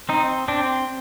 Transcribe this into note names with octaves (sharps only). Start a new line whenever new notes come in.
C4 D#4
C4 D4